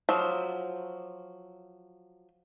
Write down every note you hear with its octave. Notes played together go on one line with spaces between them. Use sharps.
F3 F#3